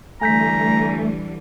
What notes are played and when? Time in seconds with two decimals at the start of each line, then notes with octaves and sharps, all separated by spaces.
0.21 D3 E3 G3 A3 G#5 A#5 G6 B6